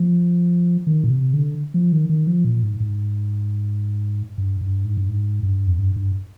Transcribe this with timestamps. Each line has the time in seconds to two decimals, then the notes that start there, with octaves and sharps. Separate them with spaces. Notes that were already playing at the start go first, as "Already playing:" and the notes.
Already playing: F3
0.87 D#3
1.04 A#2
1.10 C3
1.33 D3
1.74 F3
1.92 D#3
2.09 D#3
2.27 F3
2.45 A#2
2.63 G#2
2.80 G#2
4.38 G2
4.61 G2
4.85 G#2
4.97 G2
5.08 G#2
5.43 G2
5.67 F2
5.79 G2
5.96 G2